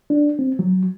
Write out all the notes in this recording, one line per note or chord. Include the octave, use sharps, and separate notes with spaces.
D4
C4
F#3